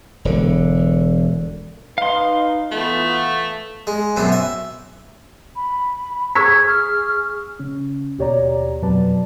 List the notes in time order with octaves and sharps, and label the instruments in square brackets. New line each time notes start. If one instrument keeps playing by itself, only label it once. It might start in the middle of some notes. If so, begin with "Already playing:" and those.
[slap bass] E1 D3
[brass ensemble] D#4 B4 [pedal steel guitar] F5 C6
[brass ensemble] E3 B3 F4 [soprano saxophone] A3
[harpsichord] G#3
F#2 B2 C4
E5
[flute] B5
[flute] G#4 [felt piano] C#6 E6 B6 [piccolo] G#6
[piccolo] F6
[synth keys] C#3 C#4
D#2 B2 G4 C#5 D5 A#5
F2 B2 F#3 B4 D5 A5